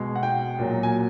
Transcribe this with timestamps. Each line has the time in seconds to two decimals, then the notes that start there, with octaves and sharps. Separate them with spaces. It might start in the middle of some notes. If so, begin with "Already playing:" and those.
Already playing: B2 G#3
0.16 F#5
0.23 G5
0.59 A#2 F#3
0.83 G#5